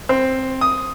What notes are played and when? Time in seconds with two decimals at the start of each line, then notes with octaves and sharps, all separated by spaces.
0.09 C4
0.61 D#6